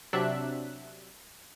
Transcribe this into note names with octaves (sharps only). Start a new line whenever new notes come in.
C3 F#3 D4 E5 F#6